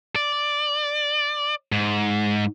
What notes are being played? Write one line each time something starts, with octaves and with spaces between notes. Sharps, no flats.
D5
G#2